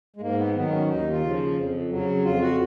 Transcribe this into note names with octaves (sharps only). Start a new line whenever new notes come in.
G#3
G#2 A#3
B3
D#3 F#3 B3
C#4
D#2 D#4
F4
C#3 F3
F2
C#3 F#3
F2 F4
F#4